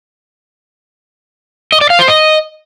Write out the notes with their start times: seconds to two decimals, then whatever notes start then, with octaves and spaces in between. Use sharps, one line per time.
1.72 D#5
1.81 D5
1.90 F5
1.99 C5
2.08 D#5